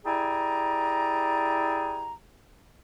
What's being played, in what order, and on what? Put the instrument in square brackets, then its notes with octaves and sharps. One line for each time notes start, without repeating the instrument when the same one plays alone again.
[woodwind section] E4 G4 G#4 D5 G#5 A#5